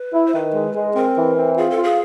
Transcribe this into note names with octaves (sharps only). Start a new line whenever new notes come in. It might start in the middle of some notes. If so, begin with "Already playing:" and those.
Already playing: B4
E4
C5
D#3 B4
G#3
G#3
C4 A#4
E3
C4
F4 G#4
A4
F4
G#4